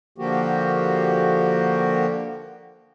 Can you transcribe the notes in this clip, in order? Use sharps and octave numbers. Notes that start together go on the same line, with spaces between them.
D3 F3 A#3 F#4 G4